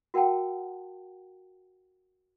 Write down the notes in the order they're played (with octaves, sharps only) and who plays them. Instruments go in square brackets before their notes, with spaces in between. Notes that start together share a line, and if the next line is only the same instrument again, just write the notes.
[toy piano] F#4 A#4 F#5 G5 A5